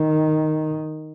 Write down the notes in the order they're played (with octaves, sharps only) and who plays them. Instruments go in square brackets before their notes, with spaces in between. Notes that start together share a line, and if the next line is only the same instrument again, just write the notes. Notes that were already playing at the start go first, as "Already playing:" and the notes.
Already playing: [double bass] D#3